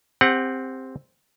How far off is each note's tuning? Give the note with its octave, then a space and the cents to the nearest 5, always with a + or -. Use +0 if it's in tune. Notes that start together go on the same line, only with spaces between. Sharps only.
C4 +0 G4 +30 F#5 +0